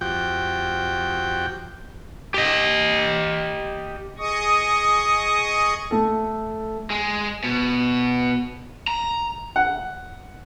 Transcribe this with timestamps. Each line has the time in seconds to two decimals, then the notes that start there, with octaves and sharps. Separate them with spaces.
0.01 F2 F#4 G4 G5
2.34 G4 D#5
4.18 G#4 D#5 C#6 D#6
5.91 A3 A4
6.90 G#3
7.44 B2
8.88 A#5
9.56 F#5